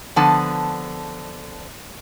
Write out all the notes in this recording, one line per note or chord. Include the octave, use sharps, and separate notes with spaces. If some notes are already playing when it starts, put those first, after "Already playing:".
D3 F3 B3 A5